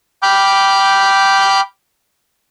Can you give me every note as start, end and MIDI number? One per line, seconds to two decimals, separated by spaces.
0.23 1.61 79
0.23 1.61 83
0.23 1.61 86
0.23 1.61 89
0.23 1.61 91